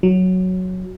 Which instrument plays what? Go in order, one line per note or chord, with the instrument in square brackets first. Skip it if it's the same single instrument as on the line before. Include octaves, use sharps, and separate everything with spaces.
[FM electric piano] F#3